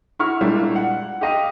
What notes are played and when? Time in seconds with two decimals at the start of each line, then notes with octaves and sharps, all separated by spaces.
0.19 E4 F#4 C#6 F6
0.41 A#2 G3 G#3 A#3 D4 E4
0.76 F#5
1.21 G4 D#5 F5